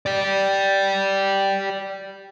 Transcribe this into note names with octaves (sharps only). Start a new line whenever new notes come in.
G4 D5